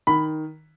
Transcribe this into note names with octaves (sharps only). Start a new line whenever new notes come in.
D#3 B5